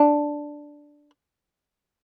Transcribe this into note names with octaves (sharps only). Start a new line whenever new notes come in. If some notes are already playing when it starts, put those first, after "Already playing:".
Already playing: D4